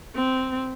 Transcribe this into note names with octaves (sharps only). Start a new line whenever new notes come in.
C4